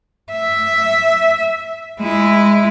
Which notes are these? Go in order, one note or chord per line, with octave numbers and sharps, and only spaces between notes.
E5
G#3 E4